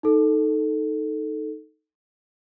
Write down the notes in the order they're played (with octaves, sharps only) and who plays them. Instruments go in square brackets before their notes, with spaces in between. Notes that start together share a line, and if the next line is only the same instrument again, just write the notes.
[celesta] D#4 A4